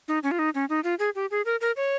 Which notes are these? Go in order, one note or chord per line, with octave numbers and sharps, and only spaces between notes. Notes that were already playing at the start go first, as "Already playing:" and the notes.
D#4
C#4
F4
D#4
C#4
D#4
F4
G#4
G4
G#4
A#4
A#4
C#5